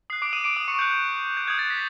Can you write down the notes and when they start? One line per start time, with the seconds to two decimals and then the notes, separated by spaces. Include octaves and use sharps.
0.10 D#6 F#6 C7
0.22 D6 D7
0.33 D#6 D#7
0.44 D6 D7
0.56 D#6 D#7
0.68 C#6 C#7
0.79 D#6 F#6 G6
1.37 G6
1.47 D#6 F#6 G#6
1.59 A6
1.70 B6